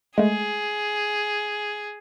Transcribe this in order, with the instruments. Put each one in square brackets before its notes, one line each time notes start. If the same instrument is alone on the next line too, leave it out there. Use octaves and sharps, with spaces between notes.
[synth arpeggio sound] G#3 A3 [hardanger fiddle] G#4